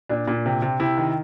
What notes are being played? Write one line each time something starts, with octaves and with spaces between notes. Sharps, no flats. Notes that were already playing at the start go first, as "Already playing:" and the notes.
A#2 D4
A#2
C3
C3
C3 E4
D#3